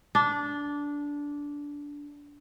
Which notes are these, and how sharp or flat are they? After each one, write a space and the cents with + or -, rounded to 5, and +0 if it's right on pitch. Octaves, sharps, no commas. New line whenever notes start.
D4 -15